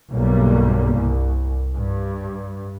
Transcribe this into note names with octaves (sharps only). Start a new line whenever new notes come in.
B1 G2 G3 A#3
C2
G2